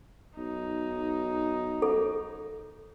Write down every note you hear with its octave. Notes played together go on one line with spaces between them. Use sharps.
B1 D#4
A4